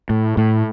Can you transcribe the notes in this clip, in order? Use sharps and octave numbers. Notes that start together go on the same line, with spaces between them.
A2
A2